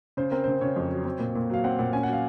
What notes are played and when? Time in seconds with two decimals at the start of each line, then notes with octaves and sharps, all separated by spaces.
0.17 C#3 C5
0.31 C4 A#4
0.44 C#3 C5
0.61 C#3 C#5
0.76 F2
0.90 F#3
1.05 C4
1.19 A#2
1.35 A#2
1.50 F#3 F5
1.64 C4 F#5
1.79 A#2 F#5
1.93 C#4 G#5
2.03 F#5
2.08 F#3 F5